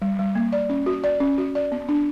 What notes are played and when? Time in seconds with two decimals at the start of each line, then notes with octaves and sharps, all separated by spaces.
0.02 G3
0.19 G3
0.35 A#3
0.52 D5
0.70 C#4
0.86 F#4
1.04 D5
1.20 C#4
1.38 F#4
1.55 D5
1.72 B3
1.89 D4